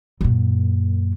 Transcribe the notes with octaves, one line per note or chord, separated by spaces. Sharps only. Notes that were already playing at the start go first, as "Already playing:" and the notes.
F#2 A#2